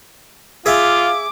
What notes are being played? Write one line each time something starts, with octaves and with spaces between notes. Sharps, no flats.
F4 G#4 E5 F5 D6